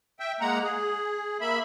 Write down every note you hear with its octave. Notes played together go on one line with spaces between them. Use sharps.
E5 G5
G#3 A#3 F#5 A#5
G#4
A#3 E5 B5